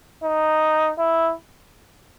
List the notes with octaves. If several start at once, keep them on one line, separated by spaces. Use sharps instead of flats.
D#4
E4